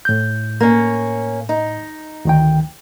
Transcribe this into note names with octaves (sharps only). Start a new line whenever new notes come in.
A2 G6
A#3 C#4
D#4
D2 D#3 G5